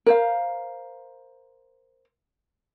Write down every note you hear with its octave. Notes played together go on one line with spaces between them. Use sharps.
A#4 C5 F5